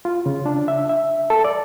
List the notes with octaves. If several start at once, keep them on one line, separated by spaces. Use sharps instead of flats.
F4
C#3
D4
E5
E5
A4
D5